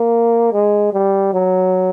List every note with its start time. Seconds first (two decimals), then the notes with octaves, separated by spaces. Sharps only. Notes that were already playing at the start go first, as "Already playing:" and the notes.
Already playing: A#3
0.53 G#3
0.93 G3
1.33 F#3